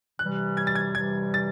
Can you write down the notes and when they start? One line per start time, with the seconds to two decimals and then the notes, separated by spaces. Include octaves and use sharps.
0.19 C3 E3 G3 F#6
0.57 G#6
0.67 A6
0.75 G#6
0.95 C3 E3 G3 G#6
1.34 A6